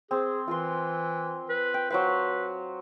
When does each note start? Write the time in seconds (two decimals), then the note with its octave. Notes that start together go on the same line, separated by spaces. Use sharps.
0.11 C4 G#4
0.48 E3 F4 A#4 C6
1.49 B4
1.74 G5
1.90 F#3 B4 C5 F5